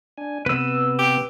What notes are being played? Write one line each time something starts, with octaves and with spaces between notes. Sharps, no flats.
D4 G#5
C3 B3 B4 E6
G4